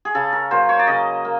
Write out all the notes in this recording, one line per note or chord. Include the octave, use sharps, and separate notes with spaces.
G#4
C#3 A4
A#4
F#3 A#3 C5
C#5
D5
C#3 D#5
A#3